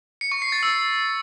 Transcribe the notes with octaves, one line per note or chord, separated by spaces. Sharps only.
C#7
C#6
C7
A6
E6